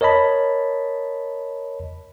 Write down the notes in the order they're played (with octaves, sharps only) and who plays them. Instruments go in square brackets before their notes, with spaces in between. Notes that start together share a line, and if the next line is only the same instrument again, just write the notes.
[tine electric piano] A#4 C#5 D#5 A5 B5